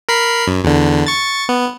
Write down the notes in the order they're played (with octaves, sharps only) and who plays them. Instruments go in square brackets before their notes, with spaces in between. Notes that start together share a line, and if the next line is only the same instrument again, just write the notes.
[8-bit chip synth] A#4 B5 C7
F#2
E2 D3
C#6 A6
B3